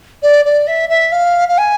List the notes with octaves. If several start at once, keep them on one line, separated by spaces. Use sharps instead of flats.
D5
D5
E5
E5
F5
F5
G#5